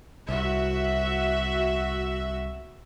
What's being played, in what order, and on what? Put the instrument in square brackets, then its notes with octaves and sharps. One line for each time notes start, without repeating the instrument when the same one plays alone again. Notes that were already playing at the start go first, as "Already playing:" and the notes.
[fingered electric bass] C2 [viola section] F#4 E5